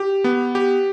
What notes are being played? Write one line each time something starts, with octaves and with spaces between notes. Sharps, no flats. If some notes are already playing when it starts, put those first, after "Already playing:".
Already playing: G4
B3
G4